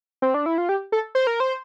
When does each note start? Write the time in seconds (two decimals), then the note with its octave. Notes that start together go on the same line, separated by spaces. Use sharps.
0.22 C4
0.34 D4
0.46 E4
0.58 F4
0.69 G4
0.92 A4
1.15 C5
1.27 A#4
1.40 C5